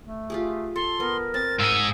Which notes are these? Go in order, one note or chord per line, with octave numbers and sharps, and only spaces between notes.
A3
F4 G4 G#4
A4 C6
B3 A#4
C4 A6
G#2 G#4 E6